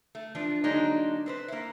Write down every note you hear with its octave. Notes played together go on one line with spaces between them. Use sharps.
A3
E3 F3 D4
D3 F#3 G#3 A#3 D4 D#4
C4 B4 C5
A#3 E4